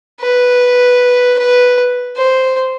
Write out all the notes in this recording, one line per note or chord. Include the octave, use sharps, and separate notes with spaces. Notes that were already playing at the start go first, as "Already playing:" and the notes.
B4
B4
C5